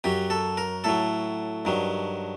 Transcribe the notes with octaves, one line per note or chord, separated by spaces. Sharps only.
F#2 F#3 G4
A4
A#4
A2 F#3 A4
G2 D#3 F#3